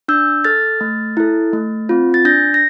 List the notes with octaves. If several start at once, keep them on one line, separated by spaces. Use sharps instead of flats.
D4 E6 G6
A4 F6 A6
A3
E4 A4
A3
C4 F4
A6
D4 G6 A#6
A#6